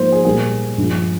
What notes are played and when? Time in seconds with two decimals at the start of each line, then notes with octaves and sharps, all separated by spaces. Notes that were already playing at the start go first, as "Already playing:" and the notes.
Already playing: G#2 F3 A#3 C5
0.12 G#4
0.25 A#2 G3 A#3 G#4
0.78 G2 F3 G#3